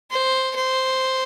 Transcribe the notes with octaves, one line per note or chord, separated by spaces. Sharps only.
C5
C5